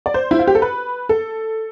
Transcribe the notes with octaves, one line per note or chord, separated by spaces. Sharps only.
D5
C5
E4
F4
G4
A4
B4
A4